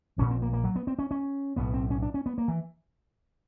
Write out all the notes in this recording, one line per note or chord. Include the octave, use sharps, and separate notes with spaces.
A#1 A#2 C#4
C4
A#3
A#3
F#3
B3
C4
C#4
C#4
B1 A2 B3
C4
C#4
D4
C#4
B3
A#3
E3